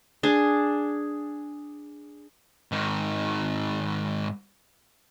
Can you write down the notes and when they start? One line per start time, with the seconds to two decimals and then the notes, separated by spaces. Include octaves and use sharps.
0.23 D4 G#4
2.72 G#2 D#3